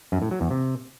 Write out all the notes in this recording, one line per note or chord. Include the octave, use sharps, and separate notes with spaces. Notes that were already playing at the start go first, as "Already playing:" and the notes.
F#2
A2
F#3
E2
C3